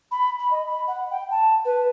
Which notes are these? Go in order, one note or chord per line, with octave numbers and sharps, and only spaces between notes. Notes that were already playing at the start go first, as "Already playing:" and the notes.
B5
B5
D#5
B5
F#5
G5
A5
B4